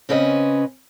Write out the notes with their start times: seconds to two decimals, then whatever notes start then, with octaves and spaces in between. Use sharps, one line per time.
0.09 C#3 C4 C#4 B4 D#5